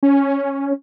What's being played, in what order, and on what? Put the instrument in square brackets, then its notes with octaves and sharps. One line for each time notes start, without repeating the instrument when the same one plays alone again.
[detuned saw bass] C#4